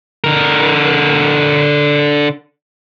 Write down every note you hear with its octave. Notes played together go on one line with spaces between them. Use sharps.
D3 A#4